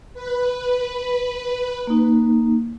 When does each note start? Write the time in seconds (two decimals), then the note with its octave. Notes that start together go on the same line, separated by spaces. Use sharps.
0.14 B4
1.87 A#3 D#4